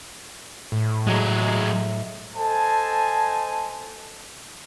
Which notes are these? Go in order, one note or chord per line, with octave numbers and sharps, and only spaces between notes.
A2
F#3 G#3
A4 C5 D#5 G#5 A5